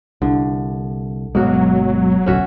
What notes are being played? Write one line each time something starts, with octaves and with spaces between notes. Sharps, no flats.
C2 D3
G1 B2 F#3 G#3 A#3 F#4
D1 B1 C#4 F#4 E5